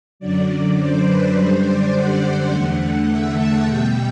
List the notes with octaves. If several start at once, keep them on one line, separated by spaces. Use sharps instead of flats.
F#2 D3 F#3 D5
C5
B4
F#2 D3 G3 C5
D5
F#5
E2 D3 A3
E5
A5
B2 G3 G5